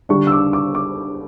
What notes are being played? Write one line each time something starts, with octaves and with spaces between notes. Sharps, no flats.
D3 G3 D4 C#6
E6
D6
D6
D6